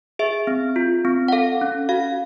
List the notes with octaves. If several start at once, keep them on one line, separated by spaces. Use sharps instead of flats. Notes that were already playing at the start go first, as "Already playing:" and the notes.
G#4 E5
C4
F4
C4
F#5
A4 F5
C#4
F#4 F5